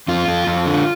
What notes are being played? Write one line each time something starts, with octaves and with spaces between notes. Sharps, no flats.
F2 F4
F2
F2
D3